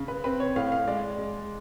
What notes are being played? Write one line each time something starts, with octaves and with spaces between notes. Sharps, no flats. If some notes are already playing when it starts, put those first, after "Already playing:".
Already playing: C#3
B4
C4 B4
C#5
A2 F5
F5
G#3 D5
G#3